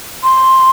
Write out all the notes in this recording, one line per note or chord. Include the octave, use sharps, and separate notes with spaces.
C6